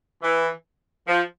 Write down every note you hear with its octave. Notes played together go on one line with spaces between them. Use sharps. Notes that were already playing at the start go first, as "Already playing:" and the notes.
E3
F3